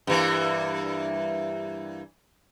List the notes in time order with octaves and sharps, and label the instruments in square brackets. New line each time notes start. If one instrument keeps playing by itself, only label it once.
[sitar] G2 E3 A#3